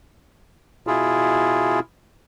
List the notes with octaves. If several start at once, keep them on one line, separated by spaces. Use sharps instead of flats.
B2 E4 F4 G#4